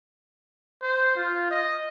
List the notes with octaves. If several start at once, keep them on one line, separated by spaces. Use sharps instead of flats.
C5
F4
D#5